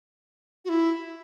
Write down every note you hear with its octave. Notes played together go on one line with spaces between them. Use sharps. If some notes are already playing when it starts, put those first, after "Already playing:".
F#4
E4